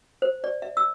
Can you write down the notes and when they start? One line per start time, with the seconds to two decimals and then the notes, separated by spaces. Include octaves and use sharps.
0.22 C5
0.44 D5
0.62 E5
0.77 E6